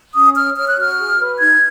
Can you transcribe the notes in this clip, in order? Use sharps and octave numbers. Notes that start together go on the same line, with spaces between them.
C#4 D#6
C#5 F6
C#5 F6
F#6
F#4 F6
G#4
B4
D#4 G#6